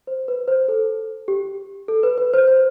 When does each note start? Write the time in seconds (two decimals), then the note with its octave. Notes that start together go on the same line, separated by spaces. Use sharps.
0.07 C5
0.28 B4
0.48 C5
0.68 A4
1.28 G4
1.88 A4
2.03 B4
2.18 B4
2.34 C5
2.47 C5